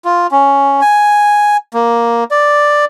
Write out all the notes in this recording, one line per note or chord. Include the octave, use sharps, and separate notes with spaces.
F4
C#4
G#5
A#3
D5